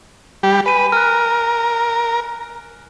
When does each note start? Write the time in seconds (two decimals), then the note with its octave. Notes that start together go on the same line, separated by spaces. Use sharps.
0.43 G3 G4
0.66 B4 G#5 D#7
0.92 A#4 F6 F#6